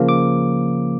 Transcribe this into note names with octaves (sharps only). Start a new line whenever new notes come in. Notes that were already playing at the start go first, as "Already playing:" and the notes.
Already playing: C#3 F3 A#3
D6